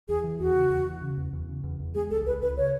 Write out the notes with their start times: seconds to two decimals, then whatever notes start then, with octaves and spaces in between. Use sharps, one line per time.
0.08 E2 G#4
0.24 E3
0.39 E2 F#4
0.55 C#3
0.70 E2
0.86 E3
1.02 C#3
1.17 E2
1.33 E2
1.49 C#3
1.64 E2
1.80 E2
1.94 G#3 G#4
2.10 C#2 A4
2.26 C#2 B4
2.42 C#2 B4
2.57 C#3 C#5